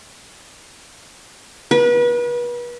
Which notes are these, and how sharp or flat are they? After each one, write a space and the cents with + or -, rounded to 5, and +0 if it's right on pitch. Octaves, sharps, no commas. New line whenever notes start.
B4 -35